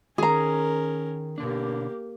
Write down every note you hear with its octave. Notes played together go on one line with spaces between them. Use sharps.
D#3 C#4 G#4 A#4 A#5
B2 D3 A#3 D4 G4